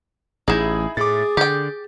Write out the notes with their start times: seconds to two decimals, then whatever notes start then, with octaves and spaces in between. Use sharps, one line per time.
0.48 A1 D#4 E4 G#4
0.97 A2 G#4 D6 A6
1.37 D3 G4 G5